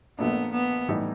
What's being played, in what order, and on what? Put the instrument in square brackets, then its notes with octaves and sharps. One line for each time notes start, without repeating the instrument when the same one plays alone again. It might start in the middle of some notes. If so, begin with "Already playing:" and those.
[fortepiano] A#1 A#2 F3 A3 D4 [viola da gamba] B3
[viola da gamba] B3
[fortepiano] A2 E3 G3 B3 D#4